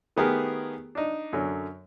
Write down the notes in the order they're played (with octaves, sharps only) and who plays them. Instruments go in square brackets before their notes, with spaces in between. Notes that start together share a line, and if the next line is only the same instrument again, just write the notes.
[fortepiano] D#3 A3 B3 G4 G#4 A#4
D4 D#4
F#2 D3 F#3